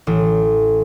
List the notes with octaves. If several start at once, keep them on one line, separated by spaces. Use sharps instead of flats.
A1